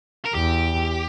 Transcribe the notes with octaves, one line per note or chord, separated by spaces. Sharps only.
A#4
E2 G4